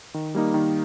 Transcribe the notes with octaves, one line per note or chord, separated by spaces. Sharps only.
D#3
G3 A#3 D#4
D#3